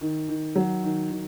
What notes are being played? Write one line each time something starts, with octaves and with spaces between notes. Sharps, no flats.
D#3
D#3
F#3
D#3
D#3